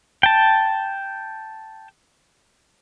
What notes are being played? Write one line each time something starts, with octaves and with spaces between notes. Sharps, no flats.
G5 A5